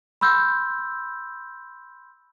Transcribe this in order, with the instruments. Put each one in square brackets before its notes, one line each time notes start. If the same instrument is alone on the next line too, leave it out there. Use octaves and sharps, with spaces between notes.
[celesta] B5 C6 E6 G6